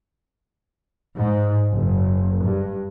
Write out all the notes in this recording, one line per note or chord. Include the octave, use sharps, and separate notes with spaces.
G#2
F#1
G2